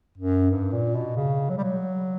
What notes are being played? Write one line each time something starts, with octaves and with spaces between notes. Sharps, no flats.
F#2
G2
A#2
B2
C#3
F#3
G3
F#3